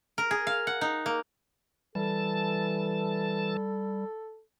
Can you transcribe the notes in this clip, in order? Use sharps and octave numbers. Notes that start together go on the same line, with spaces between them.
A#4
G#4
F5
F#5
D#4
A#3
E3 G3 A4 A5